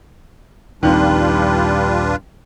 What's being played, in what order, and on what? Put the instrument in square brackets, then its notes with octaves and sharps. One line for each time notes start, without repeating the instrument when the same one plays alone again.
[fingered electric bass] D#1 A#1 C4 [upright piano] D#3 [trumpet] G3 [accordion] D4 F4 B4